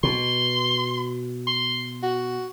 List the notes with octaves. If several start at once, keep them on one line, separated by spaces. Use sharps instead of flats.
B2 C6
C6
F#4